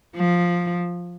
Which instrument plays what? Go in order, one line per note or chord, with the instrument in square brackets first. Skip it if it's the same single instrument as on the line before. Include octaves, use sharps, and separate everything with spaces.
[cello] F3